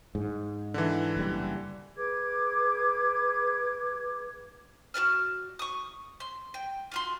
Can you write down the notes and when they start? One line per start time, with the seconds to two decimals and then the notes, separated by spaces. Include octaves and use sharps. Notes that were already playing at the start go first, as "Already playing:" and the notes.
0.15 G#2
0.74 D3 E3
1.17 F#1 G3
1.96 G#4 B4 D6 G#6
4.94 F#4 B4 D5 F6
5.59 C#6 D#6
6.20 C6
6.54 G5
6.92 F4 F#4 C6